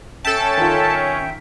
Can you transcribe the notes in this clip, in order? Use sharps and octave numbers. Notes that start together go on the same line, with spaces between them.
C#4 A4 E5 G5 A5
D#3 F4